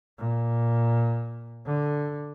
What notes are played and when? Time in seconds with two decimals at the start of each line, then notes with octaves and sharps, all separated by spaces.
0.18 A#2
1.66 D3